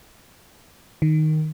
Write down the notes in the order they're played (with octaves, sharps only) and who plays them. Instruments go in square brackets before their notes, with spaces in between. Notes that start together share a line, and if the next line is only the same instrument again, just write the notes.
[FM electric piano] D#3